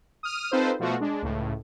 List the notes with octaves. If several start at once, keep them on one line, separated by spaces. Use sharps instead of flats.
D#6 F6 D#7
C4 D#4 F4 A4 B4 C5
B2 F3 A3 F4 F#4
G#3 D4
C#2 A2